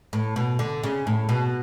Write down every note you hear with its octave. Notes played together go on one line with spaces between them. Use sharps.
A2
B2
D3
C#3
A2
B2